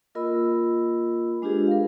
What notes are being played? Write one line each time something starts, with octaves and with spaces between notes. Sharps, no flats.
A#3 F4 A#4 D#5 B5 E6
G#3 D4 F4 G4 G#4 B4
A#4 F5